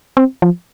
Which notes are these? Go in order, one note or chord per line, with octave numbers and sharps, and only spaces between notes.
C4
F3